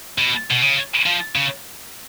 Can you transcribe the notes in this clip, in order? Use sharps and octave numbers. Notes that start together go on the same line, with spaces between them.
B2
B2
C#3
F3
C#3